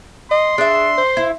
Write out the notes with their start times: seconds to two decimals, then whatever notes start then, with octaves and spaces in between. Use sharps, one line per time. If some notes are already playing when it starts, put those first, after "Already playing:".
0.31 D#5 C6
0.58 D4 G#4 E5
0.98 C5
1.17 E4